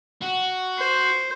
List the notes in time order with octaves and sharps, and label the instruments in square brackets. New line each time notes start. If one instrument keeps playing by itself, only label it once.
[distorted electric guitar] F#4
[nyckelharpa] C5